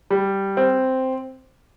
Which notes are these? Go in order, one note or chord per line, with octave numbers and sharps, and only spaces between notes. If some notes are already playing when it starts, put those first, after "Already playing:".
G3
C4